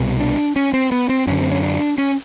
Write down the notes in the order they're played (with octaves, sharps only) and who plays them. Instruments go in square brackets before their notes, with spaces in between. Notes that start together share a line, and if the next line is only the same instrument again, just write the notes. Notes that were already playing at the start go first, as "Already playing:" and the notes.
Already playing: [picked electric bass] C2 B2
D4
C#4
C4
B3
C4
F#2 D3 C#4
C4
C#4
D4
C#4